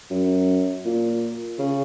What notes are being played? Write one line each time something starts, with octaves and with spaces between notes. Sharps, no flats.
F#2
A#2
C#3